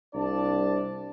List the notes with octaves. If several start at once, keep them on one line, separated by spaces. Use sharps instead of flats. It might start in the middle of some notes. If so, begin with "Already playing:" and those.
C2 D4 D5 A5